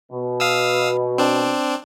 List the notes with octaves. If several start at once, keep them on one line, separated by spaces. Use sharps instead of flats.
B2
F5 D#6 E6
C4 D4